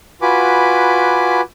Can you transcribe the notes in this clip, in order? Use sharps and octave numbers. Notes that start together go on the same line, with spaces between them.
F4 F#4 B4 G#5 B5 D6